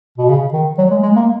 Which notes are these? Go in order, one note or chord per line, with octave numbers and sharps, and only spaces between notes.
B2
C#3
D#3
F#3
G#3
G#3
A#3